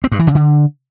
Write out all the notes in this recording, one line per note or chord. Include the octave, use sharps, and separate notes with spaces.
C4
G2
E3
C#3
D3